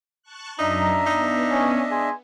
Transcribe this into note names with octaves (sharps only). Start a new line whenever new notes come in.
A5 C#6 F#6
F#2 D4 D#4 D#5 E5 A#5
B3 D#4
C#4
G#4 G#5 C6